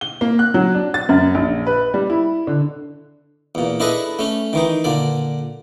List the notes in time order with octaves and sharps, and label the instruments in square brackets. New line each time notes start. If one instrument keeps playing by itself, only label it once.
[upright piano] G7
A#3
F#6
F#3
D4
A6
F#2
A#1
B4
G3
E4
D3
[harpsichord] E2 A#2
D4 E4 G#4 A4 B4 D#5
A3 C#4
D#3 E3 D#4
A#2 D3 D5